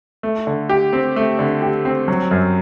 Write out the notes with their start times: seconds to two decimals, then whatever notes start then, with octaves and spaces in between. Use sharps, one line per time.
0.23 A3
0.47 D3
0.69 G4
0.93 C4
1.16 A3
1.39 D3
1.62 G4
1.85 C4
2.08 F#3
2.31 F#2